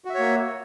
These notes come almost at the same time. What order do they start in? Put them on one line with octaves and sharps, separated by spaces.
F#4 E5 C#5 A#3